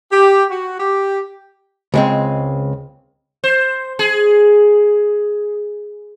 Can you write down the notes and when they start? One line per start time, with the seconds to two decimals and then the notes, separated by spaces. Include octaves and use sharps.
0.12 G4
0.50 F#4
0.79 G4
1.94 C#2 G#3 C4
3.44 C5
3.99 G#4